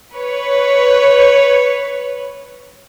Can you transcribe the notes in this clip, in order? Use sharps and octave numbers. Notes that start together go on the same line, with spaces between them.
B4 C#5